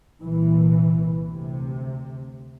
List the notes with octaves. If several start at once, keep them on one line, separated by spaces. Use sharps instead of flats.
C2 A#2 E3
D2 C3